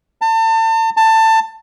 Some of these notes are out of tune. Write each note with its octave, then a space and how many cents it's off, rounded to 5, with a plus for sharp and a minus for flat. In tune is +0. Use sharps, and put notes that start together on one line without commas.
A5 +35
A5 +20